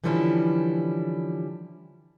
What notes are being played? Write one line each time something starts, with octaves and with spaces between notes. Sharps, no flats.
D3 E3 F3 G3 C#4 E4